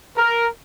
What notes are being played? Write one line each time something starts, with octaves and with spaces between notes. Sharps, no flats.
A#4